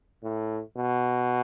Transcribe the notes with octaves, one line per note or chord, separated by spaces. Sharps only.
A2
B2